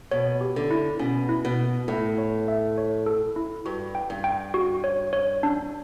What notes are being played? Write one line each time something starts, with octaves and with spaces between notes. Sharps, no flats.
B2 C#5
G4
D3
E4
B2 C#4
E4
B2
E4
A2 E5
C#5
E5
C#5
A4
E4
G2 F#4
G5
G2
G5
F#4
C#5
C#5
D4